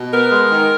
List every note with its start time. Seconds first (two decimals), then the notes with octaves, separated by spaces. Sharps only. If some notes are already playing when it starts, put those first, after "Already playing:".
Already playing: B2
0.11 B3 A#4
0.30 G#3
0.51 D#3